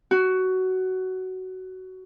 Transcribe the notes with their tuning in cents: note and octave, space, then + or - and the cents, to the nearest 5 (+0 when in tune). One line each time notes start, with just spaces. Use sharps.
F#4 +15